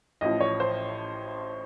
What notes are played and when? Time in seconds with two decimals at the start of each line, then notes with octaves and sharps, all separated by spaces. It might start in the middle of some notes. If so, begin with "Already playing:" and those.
0.21 A1 A2 F3 D#5
0.41 C#5
0.60 C5